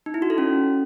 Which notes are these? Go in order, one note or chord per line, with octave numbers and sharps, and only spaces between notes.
D#4
E4
F#4
A4
C#4